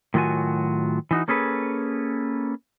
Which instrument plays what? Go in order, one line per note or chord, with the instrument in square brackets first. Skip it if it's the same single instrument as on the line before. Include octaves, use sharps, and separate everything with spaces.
[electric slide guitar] A2 D#3 F#3 F4 F#4 G#5
E3 D#4 F#4
A#3 C#4 G#4 A4 B4